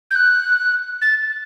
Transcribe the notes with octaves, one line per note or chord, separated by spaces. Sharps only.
G6
F#6
A6